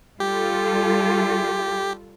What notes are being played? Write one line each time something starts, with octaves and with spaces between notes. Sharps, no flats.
G3 F4 G4 A4